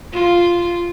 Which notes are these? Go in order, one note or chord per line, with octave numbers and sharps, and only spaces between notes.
F4